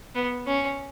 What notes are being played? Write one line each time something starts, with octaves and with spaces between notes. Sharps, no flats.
B3
C#4